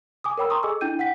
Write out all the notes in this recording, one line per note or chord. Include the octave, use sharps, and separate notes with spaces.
G#5 D6 D#6
A#4 C#5 G5 B5 E6
A#5 C6 C#6 D#6
G#4 A4 D#5 G#5 D6 E6
D4 E4 G5 G6 D#7
F#5 G5 B6